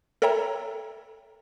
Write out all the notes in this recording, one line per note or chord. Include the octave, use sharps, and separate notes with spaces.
A4 A#4 C#5 E5 G5 A#5